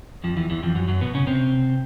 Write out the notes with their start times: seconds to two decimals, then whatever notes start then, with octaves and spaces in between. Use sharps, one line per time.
0.24 F2 F3
0.37 E2 E3
0.50 E2 E3
0.63 F2 F3
0.75 F#2 F#3
0.88 F#2 F#3
1.01 B2 B3
1.15 C#3 C#4
1.27 C3 C4